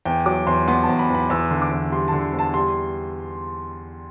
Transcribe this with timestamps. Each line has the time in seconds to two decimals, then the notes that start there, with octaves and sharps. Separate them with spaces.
0.05 E2 G5
0.26 F#3 D6
0.47 E2 C6
0.68 B3 C6
0.83 A5
0.89 E2
0.99 B5
1.10 E2 B5
1.30 E2 E6
1.51 D3
1.62 D6
1.71 E2
1.92 G3 C6
2.08 D3 A5
2.33 E2
2.39 A5
2.54 G3 C6